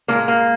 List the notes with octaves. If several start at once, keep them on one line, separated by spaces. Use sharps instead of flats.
A#2 F3 G#3 A#3
A#3